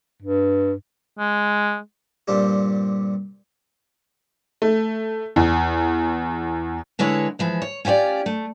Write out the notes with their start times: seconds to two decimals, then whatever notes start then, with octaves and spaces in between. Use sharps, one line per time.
0.22 G2
1.18 G#3
2.28 G2 A#2 G3 C4 D4 G4
4.62 A3
5.36 E2
6.99 D3 G#3 E4 B4 C#5
7.39 E3 F3 G#3
7.62 C#5
7.85 C#4 F4 G4 C5 D5
8.26 A3